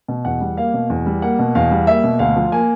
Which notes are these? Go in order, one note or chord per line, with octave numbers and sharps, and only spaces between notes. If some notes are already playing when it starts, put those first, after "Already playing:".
B2
E2 F#5
G3
A#3 F5
B2
E2
G3
A#3 F#5
B2
E2 F5
G3
A#3 E5
B2
D2 F5
F3
A#3 G#5